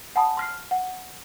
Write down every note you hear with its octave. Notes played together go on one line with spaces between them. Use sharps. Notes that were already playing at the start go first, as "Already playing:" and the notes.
F#5 G#5 A5 B5 D#6
C6 F6 C7
F#5